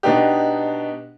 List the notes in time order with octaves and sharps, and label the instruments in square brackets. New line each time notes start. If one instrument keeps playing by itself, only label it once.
[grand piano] B2 B3 D4 D#4 G4